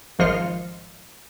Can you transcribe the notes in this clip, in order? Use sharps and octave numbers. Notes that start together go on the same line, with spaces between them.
G#1 F3 F4 D#5 F6 C#7